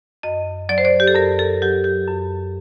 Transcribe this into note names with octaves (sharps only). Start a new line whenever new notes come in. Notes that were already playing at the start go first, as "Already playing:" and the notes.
F#2 D#5
F#3 D5
C5
D5
G4
A4
F#2 A#4
A4
F#3 G4
G4
F#2